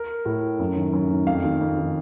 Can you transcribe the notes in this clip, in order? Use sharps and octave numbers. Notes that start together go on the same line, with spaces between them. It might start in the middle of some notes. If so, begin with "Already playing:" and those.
Already playing: A#4
A2
F#2
D#3
F#2
D#3
F2 F5
D#3
F2
D#3